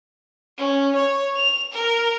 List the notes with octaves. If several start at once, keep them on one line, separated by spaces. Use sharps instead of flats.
C#4
C#5
F7
A#4